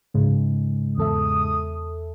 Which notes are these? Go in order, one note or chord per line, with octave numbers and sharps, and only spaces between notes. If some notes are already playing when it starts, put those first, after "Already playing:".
G#2 C#3 G#3
E2 A4 E5 D#6